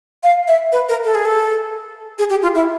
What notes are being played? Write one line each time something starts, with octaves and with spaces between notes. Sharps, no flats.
F5
E5
B4
A#4
A4
G#4
A4
G#4
G4
F4
E4